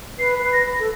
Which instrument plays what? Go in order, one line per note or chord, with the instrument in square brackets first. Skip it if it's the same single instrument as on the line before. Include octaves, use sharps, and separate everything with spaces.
[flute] B4 [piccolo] C7
[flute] B4
[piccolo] A#6
[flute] A4